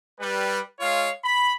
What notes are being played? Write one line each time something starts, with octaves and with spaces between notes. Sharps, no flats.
G3 B4
G#3 F4 C#5 F5
B5